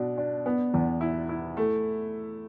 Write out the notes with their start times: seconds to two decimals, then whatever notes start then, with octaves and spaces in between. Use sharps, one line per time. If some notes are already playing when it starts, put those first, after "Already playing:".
Already playing: B2 D4
0.18 D4
0.46 B3
0.74 E2
1.01 E4
1.29 E4
1.57 A3